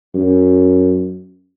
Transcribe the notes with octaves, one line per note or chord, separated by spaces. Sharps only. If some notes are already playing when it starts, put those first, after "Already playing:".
F#2